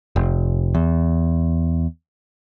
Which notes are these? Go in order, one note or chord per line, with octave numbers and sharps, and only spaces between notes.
F1
E2